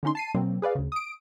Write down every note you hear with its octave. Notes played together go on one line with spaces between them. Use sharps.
D3 A#3 C#4 D#4 C6
A5 C7 D#7
B2 F#3 A#3 C4
G#4 B4 D5 F5
D2 C#3
D#6 D7